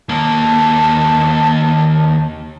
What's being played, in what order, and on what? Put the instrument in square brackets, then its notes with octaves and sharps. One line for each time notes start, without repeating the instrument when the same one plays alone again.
[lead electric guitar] D#2 A#3 [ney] A5